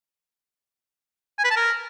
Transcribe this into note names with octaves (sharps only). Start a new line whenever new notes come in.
G#5
B4
A5
A#4